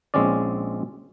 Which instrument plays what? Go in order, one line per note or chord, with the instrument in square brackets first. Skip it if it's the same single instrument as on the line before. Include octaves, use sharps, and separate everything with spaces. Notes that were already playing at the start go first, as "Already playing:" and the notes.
[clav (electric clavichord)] A#1 G#3 C4 C#4 D5